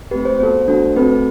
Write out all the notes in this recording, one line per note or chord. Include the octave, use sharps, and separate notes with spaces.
A3 C4 G4 B4
C5
B3 F#4 A4 C5
A3 D4 F#4 A4
A3 C4 F#4 A4 B4